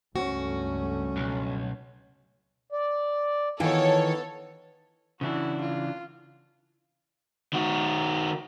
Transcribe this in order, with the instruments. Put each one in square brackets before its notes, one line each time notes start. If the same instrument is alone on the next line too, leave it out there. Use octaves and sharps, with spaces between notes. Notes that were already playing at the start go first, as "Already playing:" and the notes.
[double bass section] C#2 G2 A3 [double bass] C#4 [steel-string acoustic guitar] F#4
[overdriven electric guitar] B1
[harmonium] D5
[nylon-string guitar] D#3 E3 F4 [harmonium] B3 [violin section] A4 C#5
[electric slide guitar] C#3 E3 D4 [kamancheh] E4 F#4
[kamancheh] F4
[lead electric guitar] D#3 F#4